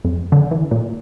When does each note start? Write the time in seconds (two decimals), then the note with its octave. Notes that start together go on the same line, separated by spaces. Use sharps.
0.05 F2
0.32 D3
0.51 E3
0.71 A#2